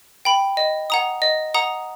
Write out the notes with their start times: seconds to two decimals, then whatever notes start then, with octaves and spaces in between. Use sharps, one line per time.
0.25 G5 B5
0.57 D#5
0.90 F#5 A#5 D#6
1.22 D#5
1.54 F#5 A#5 D#6